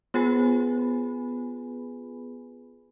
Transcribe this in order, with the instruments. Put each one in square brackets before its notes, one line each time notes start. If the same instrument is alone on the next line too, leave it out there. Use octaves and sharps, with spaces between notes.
[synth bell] B3 F4 G#4 B4 G#5 B5